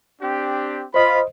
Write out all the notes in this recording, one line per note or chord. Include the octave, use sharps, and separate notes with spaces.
C4 D4 G4
F4 C5 D#5 B5